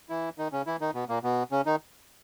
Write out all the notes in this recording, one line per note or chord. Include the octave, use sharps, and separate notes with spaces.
E3 E4
D#3 D#4
C#3 C#4
E3 E4
D#3 D#4
B2 B3
A#2 A#3
B2 B3
C#3 C#4
D#3 D#4